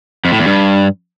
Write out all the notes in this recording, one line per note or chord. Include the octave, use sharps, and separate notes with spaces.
F2
A2
E2
G2